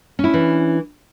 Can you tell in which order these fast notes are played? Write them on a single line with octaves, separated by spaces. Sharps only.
C#4 E4 D4 E3